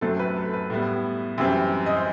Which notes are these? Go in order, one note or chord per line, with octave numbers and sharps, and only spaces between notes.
F#2 F#3 A3 C4 A4
B4
A4
B4
A2 G3 B3
F#2 E3 G3 C4
D#5
C5